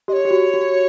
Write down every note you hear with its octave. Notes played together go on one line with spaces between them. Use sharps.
G4 C#5 D#5
G4
F#4
F#4